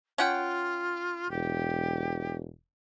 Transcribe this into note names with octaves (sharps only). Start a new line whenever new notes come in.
C#4 F4 F#5 G5
E1 G4